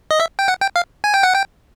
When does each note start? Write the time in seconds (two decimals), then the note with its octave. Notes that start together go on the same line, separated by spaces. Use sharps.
0.11 D#5
0.20 E5
0.39 G5
0.48 F#5
0.61 G5
0.76 F5
1.04 G#5
1.14 G5
1.23 F#5
1.34 G5